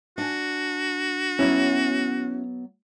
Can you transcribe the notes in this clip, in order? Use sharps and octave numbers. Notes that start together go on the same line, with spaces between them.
D4 F#4 G#5
F#3 B3 C#4 E4